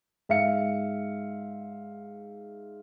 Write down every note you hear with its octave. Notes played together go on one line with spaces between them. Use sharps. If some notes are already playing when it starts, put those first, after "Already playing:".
G#2 E5 F5 C#7